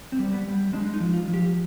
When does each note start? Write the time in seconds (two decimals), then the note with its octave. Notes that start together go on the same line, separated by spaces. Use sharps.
0.12 C4
0.19 G3
0.33 B3
0.46 G3
0.73 G#3 D4
0.94 D#4
1.00 F3
1.14 F4
1.28 F3
1.34 G4